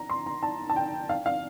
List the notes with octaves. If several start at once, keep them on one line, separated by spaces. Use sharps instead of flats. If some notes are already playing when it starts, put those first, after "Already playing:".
Already playing: A#5
C6
A#5
A5
A5
G5
F5
F5